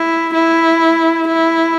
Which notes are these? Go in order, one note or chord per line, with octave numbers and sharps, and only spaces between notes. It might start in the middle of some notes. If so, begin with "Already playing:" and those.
Already playing: E4
E4
E4